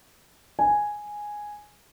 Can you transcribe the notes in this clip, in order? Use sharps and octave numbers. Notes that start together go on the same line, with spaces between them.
G#5